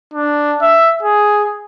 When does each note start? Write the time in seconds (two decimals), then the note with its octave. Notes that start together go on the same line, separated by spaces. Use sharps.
0.14 D4
0.62 E5
1.03 G#4